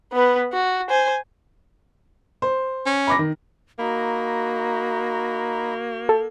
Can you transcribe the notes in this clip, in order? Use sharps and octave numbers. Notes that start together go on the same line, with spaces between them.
B3 B4
F#4
C5 G#5
C5
C#4
B5 D6 A#6
D#3
A#3 D#4 F#4 A#5 B5
A4